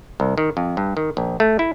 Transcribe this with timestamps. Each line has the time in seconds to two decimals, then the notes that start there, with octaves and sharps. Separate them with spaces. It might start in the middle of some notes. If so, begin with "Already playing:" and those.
0.20 C2
0.38 D#3
0.57 F2
0.77 G2
0.97 D#3
1.17 A#1
1.40 A3
1.59 E4